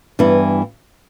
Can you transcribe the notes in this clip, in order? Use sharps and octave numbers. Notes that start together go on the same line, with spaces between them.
G2 E3 B3 E4